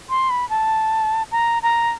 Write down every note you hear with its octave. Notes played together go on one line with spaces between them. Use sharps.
C6
B5
A5
A#5
A#5